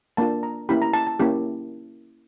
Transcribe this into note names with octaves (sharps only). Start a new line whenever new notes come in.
A#3 D4 F4 A5
A#5
A#3 C#4 E4 G4 B5
A#5
A5
A5
A#3 C#4 E4 G4